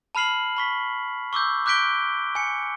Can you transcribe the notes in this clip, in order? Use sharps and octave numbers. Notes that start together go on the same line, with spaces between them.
A5 B5 F6 C7 F#7
B5 C#6 B6
C#6 D6 E6 G6
D6 F#6 G6 B6 D7 G7
G#5 C#7